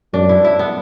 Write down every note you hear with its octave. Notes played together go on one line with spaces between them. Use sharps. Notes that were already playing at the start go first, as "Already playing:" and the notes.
F#2 D4
E4
E4
B3